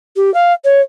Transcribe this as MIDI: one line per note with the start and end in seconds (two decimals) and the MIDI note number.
0.16 0.33 67
0.34 0.52 77
0.64 0.80 73